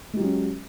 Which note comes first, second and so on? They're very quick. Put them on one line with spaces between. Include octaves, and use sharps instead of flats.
G#3 G4 F#3 C#4